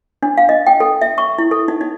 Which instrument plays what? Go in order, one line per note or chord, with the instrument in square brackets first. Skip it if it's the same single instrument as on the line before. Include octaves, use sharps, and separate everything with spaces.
[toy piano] D4
F5
D#5
G5
A4
E5
C#6
E4
A4
D#4
D#4